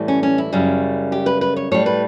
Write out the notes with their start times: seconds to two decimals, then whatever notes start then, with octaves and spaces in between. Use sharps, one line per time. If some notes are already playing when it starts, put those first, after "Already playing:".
Already playing: A2 E3 G3
0.08 C#4
0.23 C#4
0.38 E4
0.53 F#2 C#3 G3
1.12 G4
1.26 B4
1.41 B4
1.56 C#5
1.72 A2 G3 C#5
1.86 B4